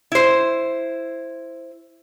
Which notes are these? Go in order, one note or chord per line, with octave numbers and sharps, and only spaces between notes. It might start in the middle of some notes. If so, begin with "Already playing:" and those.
E4 C5